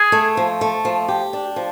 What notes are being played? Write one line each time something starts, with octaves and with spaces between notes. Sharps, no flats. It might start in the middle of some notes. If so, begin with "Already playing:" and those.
Already playing: G#4
A3
F3
A3
F3
G4
D4
F3